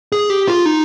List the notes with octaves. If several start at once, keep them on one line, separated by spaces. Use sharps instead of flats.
G#4
G4
F4
D#4